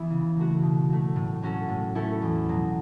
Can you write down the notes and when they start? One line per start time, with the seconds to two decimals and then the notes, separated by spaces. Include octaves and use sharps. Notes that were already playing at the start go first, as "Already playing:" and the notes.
Already playing: E3 B3 E4
0.10 C#3
0.36 F#3 A3 F#4
0.63 B2
0.89 F#3 A3
1.16 A2
1.42 F#3 C#4 F#4 A4
1.69 A2
1.95 A3 C#4 E4 A4
2.22 E2
2.49 B2 F#3